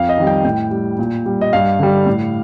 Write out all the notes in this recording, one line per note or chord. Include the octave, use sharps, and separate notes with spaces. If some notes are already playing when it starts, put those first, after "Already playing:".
Already playing: F2 F5
D#5
D#3 G3
G5
A2 G5
G3
A#2
G3
D#5
G2 F5
D3 G3
A2